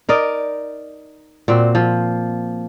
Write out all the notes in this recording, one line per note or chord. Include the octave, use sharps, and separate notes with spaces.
D#4 A#4 D5 D#5
A#2 C4 F#4
F3